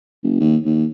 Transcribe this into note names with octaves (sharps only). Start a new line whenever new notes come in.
F#1
D#2
D#2